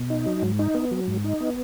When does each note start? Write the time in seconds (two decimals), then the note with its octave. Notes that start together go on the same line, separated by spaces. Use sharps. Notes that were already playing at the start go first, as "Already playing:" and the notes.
Already playing: B2
0.10 D#4
0.26 F#3
0.42 G#2
0.59 D#4
0.75 B3
0.91 F#3
1.08 G#2
1.24 D#4
1.40 B3